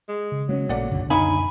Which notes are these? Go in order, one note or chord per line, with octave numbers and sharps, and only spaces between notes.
G#3
C#3
F#3 G#3 A#3 C#4
A#1 A#2 A3 D5 F#5
C#2 F#2 B2 D3
F#2 D#4 F5 G#5 B5